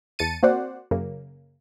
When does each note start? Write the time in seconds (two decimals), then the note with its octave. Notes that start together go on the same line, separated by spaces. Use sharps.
0.19 E2 A5 A6 C#7 D#7
0.43 A#3 C4 F#4 C5 D5 F#5
0.91 F#2 C#3 A#3